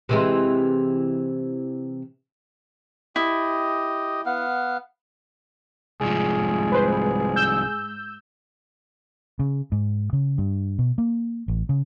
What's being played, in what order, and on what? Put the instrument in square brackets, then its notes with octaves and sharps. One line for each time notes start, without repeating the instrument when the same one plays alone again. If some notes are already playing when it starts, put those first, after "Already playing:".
[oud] C3 E3 G#3
[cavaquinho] E4 [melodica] G4 D#5
[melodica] B3 F5 F#5
[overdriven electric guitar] C2 F3 [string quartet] G#2 [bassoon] G#4
[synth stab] B4 C5
E6 G6
[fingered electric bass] C#3
G#2
C#3
G2
B2
A#3
A1
C#3